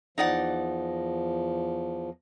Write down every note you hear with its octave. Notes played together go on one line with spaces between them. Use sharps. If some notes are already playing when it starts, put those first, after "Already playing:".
E2 F3 D#4 D5 F#5